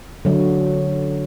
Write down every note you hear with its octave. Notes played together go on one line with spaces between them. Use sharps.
D3 F#3